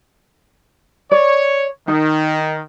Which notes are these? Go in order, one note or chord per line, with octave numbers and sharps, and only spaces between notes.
C#5 D5
D#3 D#4